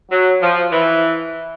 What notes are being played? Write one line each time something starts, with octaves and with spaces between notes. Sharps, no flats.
F#3
F3
E3